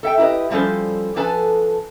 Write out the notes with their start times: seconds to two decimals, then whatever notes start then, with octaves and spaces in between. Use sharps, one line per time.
0.03 A4 E5 G5
0.17 E4 G4 A#4 B4 D#5
0.50 F3 G3 C#4 A4 C5
1.16 F3 D4 A4 B4 G#5 A5